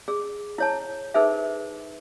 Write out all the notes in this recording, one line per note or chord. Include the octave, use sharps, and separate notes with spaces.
G#4
E4 C#5 A5
D#4 G#4 A4 B4 C5 E5